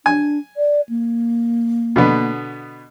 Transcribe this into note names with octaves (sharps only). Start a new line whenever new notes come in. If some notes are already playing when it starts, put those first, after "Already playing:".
D4 G#5
D5
A#3
B2 D3 B3